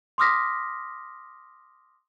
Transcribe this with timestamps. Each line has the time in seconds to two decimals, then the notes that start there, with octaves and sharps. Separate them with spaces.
0.18 C6 D6 D#6 F6 A#6 B6